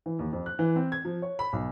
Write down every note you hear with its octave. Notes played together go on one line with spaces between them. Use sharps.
E3
D#2
F2
F#6
E3
C4
G#6
F3
C#5
B5
B1